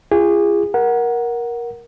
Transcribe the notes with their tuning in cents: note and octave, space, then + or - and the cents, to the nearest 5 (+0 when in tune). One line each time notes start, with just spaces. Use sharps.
F4 -35 G#4 -25
A#4 +15 F#5 +0